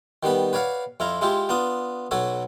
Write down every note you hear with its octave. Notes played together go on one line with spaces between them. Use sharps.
D#3 G3 B3 B4
B4 C#5 D5 F5 F#5
F2 E4 F4 A#5
G#3 E4 F4 G4
B3 D4 F4 D#6
B1 F#3 F#4 A4 C#5